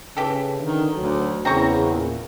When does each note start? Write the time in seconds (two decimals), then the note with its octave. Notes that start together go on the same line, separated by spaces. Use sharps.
0.17 C#3 E3 G4 A4
0.60 D3 D#3
0.95 D2 F#3
1.45 E2 C#3 C4 A#5 C#6
1.93 A#2